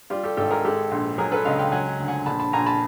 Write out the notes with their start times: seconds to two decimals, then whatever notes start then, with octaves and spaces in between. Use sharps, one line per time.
0.10 G3 F4 G4
0.23 G4 A4
0.37 G#1 G4 A4
0.51 G#4 A#4
0.64 G#3 G4 A4
0.91 A#1
1.18 F#3 G#4 A#4
1.32 A4 B4
1.45 C#2 D#5 F5
1.59 F5 G5
1.72 F#3 F#5 G#5
1.99 D2
2.08 F#5 G#5
2.26 A#1 A5 B5
2.39 A5 B5
2.53 A#1 G#5 A#5
2.66 A5 B5